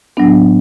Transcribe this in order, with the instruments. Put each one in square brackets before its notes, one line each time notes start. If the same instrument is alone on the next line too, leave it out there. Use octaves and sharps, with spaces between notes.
[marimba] A2 F#3 B3 D4